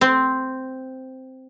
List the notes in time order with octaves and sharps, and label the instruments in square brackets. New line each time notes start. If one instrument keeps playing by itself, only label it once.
[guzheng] C4